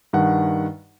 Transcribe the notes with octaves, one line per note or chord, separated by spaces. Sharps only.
G2 D#3 F#5